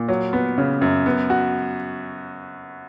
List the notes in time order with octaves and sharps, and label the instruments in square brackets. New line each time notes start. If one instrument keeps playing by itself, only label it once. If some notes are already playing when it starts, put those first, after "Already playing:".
Already playing: [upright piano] A#2
F#3
B3
C#3
F#2
B3
F#4